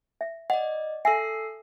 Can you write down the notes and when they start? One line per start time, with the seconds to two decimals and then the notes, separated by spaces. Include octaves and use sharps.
0.21 E5
0.50 D5 D#5 F#5
1.05 A4 E5 G#5 E6 C7